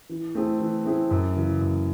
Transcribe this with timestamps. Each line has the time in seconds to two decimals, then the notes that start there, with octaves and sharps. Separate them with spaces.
0.09 E3
0.35 A3 C4 E4 G#4
0.60 E3
0.85 A3 C4 E4 G#4
1.11 F#2
1.36 C#3 E3
1.61 F#2